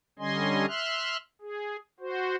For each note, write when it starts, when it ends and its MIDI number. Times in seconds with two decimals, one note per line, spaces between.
0.19 0.66 50
0.19 0.66 55
0.19 0.66 61
0.19 0.66 75
0.19 0.66 80
0.19 0.66 84
0.67 1.17 76
0.67 1.17 84
0.67 1.17 89
0.67 1.17 90
1.41 1.77 68
2.00 2.36 66
2.00 2.36 72